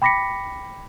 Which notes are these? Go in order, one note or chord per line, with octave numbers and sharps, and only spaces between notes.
G5 B5 D6 A#6 B6 C#7